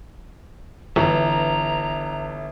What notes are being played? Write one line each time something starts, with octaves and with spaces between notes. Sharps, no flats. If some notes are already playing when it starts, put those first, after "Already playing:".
G1 E3 A#5